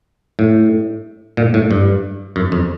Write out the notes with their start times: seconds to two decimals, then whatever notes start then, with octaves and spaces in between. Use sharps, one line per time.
0.39 A2
1.37 A#2
1.54 A2
1.71 G2
2.36 F#2
2.52 F2